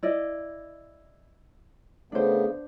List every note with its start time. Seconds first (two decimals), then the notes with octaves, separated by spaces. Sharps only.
0.03 E4 D5 D#5
2.12 C#3 A3 B3 D4 C5